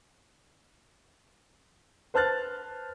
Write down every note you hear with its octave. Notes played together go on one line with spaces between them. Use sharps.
B4 C5 A5 F6 F#6 A6